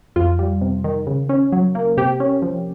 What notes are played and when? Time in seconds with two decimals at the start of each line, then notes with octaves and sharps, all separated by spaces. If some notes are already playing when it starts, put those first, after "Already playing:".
0.16 F2 F4
0.39 G3
0.61 C3
0.84 D#3
1.07 C#3
1.29 C#4
1.52 F#3
1.75 A#3
1.97 C3 G4
2.20 C#4
2.42 F3